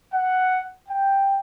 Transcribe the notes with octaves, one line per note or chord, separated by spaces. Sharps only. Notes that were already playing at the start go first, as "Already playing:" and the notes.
F#5
G5